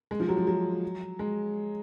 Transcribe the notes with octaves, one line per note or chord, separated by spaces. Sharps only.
G#3
F3
F#3
F3
F#3
G#3